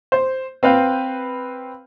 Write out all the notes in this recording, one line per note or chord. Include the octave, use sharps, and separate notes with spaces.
C5
C4 B4 F5 G5